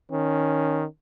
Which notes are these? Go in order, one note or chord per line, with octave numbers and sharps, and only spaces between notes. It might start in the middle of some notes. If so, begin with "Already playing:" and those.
D#3 C#4